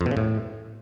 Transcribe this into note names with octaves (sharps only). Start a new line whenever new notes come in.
F2
B2
C#3
A2